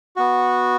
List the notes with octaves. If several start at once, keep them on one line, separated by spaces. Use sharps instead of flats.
B3 F#4